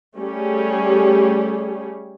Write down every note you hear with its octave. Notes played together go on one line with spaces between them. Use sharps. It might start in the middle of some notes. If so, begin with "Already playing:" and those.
G3 A3 C#4 G4 G#4